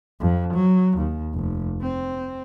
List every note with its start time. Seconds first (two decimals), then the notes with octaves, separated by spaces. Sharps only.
0.20 F2
0.54 F#3
0.97 D#2
1.34 F1
1.81 C4